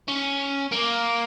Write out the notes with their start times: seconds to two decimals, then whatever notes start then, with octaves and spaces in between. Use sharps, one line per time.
0.08 C#4
0.72 A#3